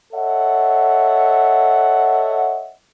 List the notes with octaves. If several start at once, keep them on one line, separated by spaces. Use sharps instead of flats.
A4 C#5 D#5 E5 F#5